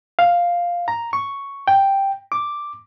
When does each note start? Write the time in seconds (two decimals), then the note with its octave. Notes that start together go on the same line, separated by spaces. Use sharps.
0.19 F5
0.88 A#5
1.13 C#6
1.68 G5
2.32 D6